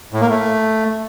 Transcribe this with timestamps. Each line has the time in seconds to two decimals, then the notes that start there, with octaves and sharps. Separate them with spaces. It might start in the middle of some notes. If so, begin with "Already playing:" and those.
0.13 A2
0.21 A#3
0.30 A3